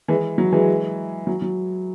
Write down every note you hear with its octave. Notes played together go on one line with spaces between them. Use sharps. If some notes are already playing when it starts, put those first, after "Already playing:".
E3 G#3
F#3
E3 G#3
F#3
F#3